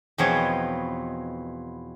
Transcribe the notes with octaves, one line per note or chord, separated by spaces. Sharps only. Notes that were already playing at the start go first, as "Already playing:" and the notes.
E2 B2 F3 C4 D#4 C#5